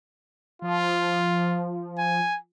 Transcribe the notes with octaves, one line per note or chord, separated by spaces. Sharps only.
F3 F4
G#5